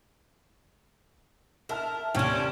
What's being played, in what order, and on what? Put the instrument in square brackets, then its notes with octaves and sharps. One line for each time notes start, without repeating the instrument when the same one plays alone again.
[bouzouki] A#4 [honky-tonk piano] E5 A5 F6
[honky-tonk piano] D#2 [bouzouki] C3 D4 [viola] C#4